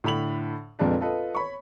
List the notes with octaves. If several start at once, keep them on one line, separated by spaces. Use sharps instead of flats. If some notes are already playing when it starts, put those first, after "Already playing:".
A2 D3 B5 F7 F#7
F1 F2 A#2 G#3 D4 B4
F4 A4 B4 D#5
C#5 B5 C#6